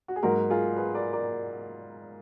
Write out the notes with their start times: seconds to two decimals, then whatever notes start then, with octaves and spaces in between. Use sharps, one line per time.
0.08 F#4
0.16 G#4
0.23 G#2 F#3 A#3 F#4 A#4
0.50 F4 G#4
0.76 G#4 B4
0.94 A#4 D5
1.13 A#4 D5